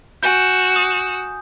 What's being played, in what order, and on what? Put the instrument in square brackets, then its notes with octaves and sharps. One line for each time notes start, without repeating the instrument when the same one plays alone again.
[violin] F#4 E6 [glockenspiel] G#5 G6
[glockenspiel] D#6